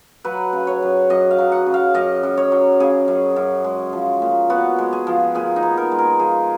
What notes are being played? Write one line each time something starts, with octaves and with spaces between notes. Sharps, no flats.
F#3 B4
C#3
C#5
F#2
F#2 D#5
F5
F#3
F#5
C#3
F5
F#2 D#5
F#2
C#5
F#3
C#3 G#4
F#2
F#2
G#3
F3
A#2
B3 F#4
G#3
G#4
F3
A#2 G#4
D#4
B3
A#4
G#3
A#4
F3 G#4